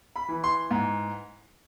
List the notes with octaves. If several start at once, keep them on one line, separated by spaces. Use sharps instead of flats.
B5
E3
C6
G#2